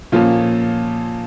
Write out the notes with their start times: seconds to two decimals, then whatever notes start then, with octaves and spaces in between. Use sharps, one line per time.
0.12 A#2 F3 A#3 C#4 F4